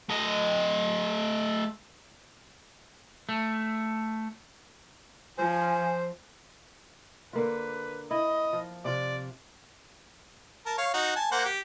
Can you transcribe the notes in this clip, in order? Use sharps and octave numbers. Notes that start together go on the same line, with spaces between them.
A3 D#5
A3
F3 C5 G#5
D3 A#3 F4 B4
E4 D#5
F3
C3 F4 D5
A#4 A5
C#5 F5
D#4 F#4
G#5 A5
A#3 C5 F#5
G4